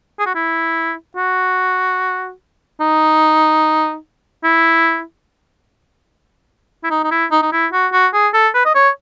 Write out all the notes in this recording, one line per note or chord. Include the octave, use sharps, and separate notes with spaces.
G#4
F#4
E4
F#4
D#4
E4
E4
D#4
D#4
E4
D#4
D#4
E4
F#4
F#4
G#4
A4
B4
D#5
C#5